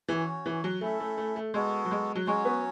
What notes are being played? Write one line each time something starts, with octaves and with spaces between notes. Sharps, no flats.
E3 C#4 F#4 C#5
E3
F#3
A3 C#4 E4 A4 E5
A3
A3
A3
G#3 B3 F#4 A4
F#3
G#3
F#3
F#3 G#3 C#4 F#4 C#5
B3